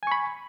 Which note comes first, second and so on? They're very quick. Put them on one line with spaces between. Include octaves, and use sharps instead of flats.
G#5 C#6 B5